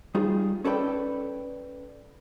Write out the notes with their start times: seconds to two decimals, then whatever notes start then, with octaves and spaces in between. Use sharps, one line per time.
0.15 G3 D#4 F4 G#4
0.64 C#4 A4 B4 D5 G5